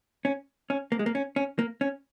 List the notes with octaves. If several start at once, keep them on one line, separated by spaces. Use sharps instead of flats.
C#4
C#4
A#3
G#3
A#3
C#4
C#4
A#3
C#4